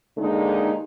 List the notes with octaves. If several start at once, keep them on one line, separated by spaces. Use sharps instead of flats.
D#2 D3 G#3 D#4